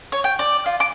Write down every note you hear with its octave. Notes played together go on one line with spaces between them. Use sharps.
C#5
G5
D5
F4
D6